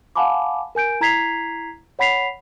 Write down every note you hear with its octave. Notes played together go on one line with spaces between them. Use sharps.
F5 F#5 G#5 A5 B5 D6
A#4 G#5 G6 D7
E4 A#5 G#6 B6 C7 F7
C#5 F#5 B5 B6 C7 F7